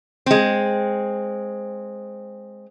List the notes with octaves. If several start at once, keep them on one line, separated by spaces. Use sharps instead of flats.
G#3 C4